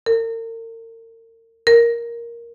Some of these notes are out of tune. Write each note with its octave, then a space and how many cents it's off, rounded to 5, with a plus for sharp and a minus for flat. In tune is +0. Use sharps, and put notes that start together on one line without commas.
A#4 -40
A#4 +5